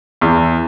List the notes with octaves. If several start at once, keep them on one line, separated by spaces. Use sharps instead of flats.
E2